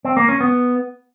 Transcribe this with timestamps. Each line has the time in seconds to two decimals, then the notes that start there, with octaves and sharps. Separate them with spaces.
0.05 C4
0.17 A#3
0.29 C#4
0.41 B3